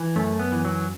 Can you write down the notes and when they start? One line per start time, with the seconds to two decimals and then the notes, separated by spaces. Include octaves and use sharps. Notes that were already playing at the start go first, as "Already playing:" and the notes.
Already playing: E3
0.16 F#2 A3
0.39 B3
0.52 E3
0.65 F#3